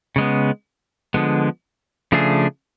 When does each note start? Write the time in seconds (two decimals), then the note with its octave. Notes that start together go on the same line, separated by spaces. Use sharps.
0.16 C#3 G#3 B3
1.14 D3 F3 G#3 B3
2.12 C#3 F3 A3 D4 G#4